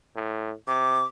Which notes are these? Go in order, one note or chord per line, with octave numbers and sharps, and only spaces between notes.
A2
C3 D6